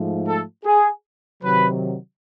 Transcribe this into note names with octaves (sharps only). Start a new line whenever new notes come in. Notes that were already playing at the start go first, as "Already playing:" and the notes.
Already playing: G#2 F3 A3
A4
G#4
C3 D#3 F#3 B4